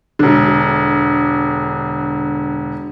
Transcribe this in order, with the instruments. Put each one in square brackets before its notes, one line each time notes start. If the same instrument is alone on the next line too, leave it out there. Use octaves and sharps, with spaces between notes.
[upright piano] E1 D3